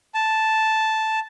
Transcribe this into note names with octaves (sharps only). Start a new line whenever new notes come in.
A5